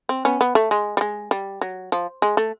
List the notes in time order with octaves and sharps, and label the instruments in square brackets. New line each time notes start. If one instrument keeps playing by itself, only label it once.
[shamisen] C4
B3 C#4
B3
A3
G#3
G3
G#3
G3
F#3
F3
G#3
A3